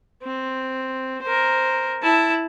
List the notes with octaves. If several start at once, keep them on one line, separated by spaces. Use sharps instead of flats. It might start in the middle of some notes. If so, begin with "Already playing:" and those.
C4
A#4 C5
E4 A5